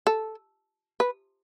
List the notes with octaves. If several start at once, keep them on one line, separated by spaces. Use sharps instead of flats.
A4
B4